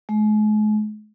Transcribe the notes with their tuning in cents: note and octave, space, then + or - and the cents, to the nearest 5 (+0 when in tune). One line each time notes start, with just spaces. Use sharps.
G#3 +40